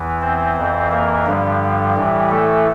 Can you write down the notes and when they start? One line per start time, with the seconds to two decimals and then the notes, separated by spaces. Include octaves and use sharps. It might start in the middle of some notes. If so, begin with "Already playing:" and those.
Already playing: E2 E3
0.21 C4 C5
0.57 F2 E3
0.91 A#3 A#4
1.26 G2 D3 F3 G3 G4
1.96 A2 E3
2.30 A3 A4